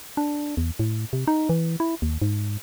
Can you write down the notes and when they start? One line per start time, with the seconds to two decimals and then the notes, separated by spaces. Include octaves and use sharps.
0.17 D4
0.57 E2
0.79 A2
1.13 C3
1.27 D#4
1.49 E3
1.80 E4
2.02 D#2
2.22 G#2